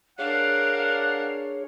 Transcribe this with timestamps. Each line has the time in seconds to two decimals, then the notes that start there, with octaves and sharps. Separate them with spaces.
0.19 D4 G#4 A#4 C#5 F5 F#5